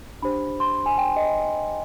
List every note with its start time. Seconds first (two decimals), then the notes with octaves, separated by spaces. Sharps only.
0.22 D4 G4 C5 B5
0.60 C6
0.86 G#5
0.98 G5
1.16 D#5